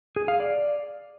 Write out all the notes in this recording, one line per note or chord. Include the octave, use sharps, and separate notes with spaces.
G#4
F5
D5